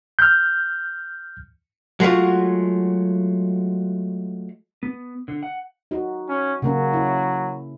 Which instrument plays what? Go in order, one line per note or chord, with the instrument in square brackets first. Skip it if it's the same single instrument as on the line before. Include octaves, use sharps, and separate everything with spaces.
[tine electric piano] F6 G6
[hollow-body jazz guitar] F#3 G#3 A3 F4 F#4
[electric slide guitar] B3
D3
F#5
[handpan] D#4 F#4
[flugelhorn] C#4
[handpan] C#3 A#3 C#4 [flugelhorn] F#3
[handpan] E4